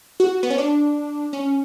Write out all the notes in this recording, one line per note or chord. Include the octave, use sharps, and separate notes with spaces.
F#4
B3
C#4
D4
C#4